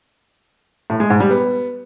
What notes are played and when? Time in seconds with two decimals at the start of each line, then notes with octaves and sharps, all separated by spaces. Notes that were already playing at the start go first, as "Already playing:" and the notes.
0.90 A2
1.00 G#3
1.10 G#2
1.20 G3
1.30 B3